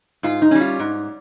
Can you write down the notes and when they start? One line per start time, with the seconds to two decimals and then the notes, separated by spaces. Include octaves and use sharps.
0.23 G#2 F4
0.42 D#4
0.51 G3 C#4
0.61 F4
0.79 G#2